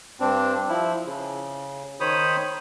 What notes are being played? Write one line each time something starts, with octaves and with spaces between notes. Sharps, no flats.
G2 C4 D4
F3 E4
C#3
D#3 C5 C#5 B5 D#6